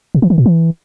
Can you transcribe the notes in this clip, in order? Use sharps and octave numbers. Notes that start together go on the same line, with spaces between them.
B2
E3
D#3
A#2
E3